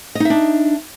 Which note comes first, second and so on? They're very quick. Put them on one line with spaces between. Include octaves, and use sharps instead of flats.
D#5 D#4 E5 D4